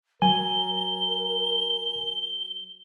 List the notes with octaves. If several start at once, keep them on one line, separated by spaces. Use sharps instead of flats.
F#3 A#4 G#5 G7